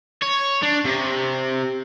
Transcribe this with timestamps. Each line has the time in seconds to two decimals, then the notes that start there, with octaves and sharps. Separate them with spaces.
0.22 C#5
0.62 D4
0.85 C3